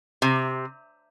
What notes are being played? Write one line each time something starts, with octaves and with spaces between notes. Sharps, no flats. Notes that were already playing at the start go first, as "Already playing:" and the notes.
C3